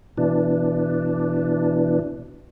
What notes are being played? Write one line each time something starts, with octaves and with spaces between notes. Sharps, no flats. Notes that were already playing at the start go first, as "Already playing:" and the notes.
B2 E3 D4